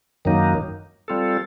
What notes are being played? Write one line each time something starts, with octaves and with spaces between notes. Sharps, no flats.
F#2 D#3 F#3 A#3 D#4
G3 C4 F4 A4